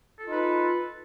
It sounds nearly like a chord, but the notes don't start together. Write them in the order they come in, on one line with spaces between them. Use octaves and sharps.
A4 F4 D#4 B4